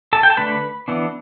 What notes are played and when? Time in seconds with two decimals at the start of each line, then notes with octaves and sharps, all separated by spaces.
0.13 A4 A5
0.23 G5
0.30 A5
0.37 D3 A3 D4 B4 B5
0.88 E3 B3 D4